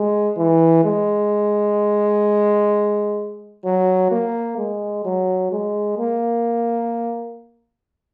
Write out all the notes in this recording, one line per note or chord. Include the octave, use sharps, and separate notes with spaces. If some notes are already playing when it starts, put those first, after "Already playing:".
Already playing: G#3
E3
G#3
F#3
A#3
G#3
F#3
G#3
A#3